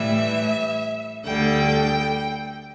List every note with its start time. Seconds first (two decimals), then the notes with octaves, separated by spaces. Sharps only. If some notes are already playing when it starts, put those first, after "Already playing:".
Already playing: A2 E3 G3 E5
1.26 D2 D3 G3 G5